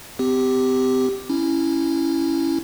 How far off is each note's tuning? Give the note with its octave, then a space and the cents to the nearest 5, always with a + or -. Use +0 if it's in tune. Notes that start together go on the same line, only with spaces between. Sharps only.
C4 -40 G4 +0
C#4 +0 E4 +0